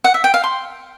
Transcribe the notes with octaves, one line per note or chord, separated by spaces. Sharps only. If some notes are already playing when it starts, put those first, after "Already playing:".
F#5
E5
G5
F5
C6